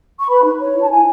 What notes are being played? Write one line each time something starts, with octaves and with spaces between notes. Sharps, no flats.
C#6
B4 B5
D#4
C#5
E4
A5
E4 G#5